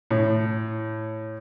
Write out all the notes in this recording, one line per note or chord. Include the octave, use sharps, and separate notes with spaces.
A2